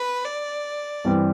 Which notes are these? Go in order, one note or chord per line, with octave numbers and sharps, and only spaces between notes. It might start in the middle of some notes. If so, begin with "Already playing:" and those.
Already playing: B4
D5
G2 E3 G3 C4 G4